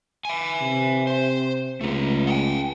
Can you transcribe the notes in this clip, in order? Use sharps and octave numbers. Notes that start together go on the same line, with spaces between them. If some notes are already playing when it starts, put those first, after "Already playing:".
E5 G#5
C3
C5
C#2 A3 B3
F#5 G5